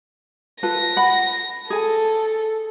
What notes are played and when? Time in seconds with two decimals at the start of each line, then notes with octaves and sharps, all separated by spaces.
0.63 F4 A4 B4 A#6
0.97 F#5 B5
1.70 G#4 A4 G#5